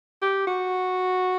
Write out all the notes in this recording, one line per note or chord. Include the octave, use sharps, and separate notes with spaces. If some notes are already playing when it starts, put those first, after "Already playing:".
G4
F#4